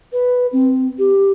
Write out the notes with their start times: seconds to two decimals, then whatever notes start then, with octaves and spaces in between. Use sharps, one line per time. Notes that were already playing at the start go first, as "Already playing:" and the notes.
0.12 B4
0.52 C4
0.98 G4